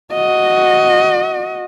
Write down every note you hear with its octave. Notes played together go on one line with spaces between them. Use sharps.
F#4 D#5